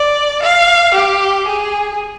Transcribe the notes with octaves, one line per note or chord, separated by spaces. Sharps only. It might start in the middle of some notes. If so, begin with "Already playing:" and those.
Already playing: D5
F5
G4
G#4